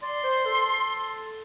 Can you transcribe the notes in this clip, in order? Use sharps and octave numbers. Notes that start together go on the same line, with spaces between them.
D5 C6
C5
A4